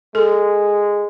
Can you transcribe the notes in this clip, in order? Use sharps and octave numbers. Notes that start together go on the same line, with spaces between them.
G#3 A4